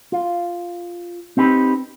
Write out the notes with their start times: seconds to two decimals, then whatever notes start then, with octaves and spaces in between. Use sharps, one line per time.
0.12 F4
1.37 C4 D#4 G4 B4